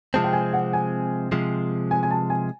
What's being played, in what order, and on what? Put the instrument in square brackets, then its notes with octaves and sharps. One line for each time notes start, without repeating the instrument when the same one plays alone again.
[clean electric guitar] C3 F3 G#3 C4 [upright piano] A5
[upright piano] G5
G#5
F#5
G#5
[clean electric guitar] C3 F3 G#3
[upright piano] G#5
G#5
A5
G#5